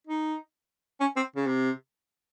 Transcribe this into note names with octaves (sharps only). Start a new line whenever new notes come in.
D#4
C#4
C4
C#3
C3